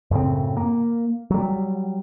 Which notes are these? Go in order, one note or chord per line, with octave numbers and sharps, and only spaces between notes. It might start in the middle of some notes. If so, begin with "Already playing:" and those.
F#2 A2 C#3 C4
A#3
F#3 G3